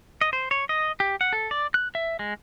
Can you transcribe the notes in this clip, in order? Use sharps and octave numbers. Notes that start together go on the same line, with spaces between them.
D#5
C5
C#5
D#5
G4
F#5
A4
D5
F#6
E5
G#3